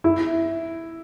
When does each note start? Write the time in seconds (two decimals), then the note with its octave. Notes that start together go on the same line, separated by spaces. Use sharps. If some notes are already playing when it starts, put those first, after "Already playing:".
0.04 E4